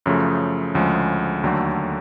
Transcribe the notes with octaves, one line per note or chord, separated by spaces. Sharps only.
F#2 C#3 F3 A3
D2 C#3 F3 G#3
D#2 D3 F#3 A3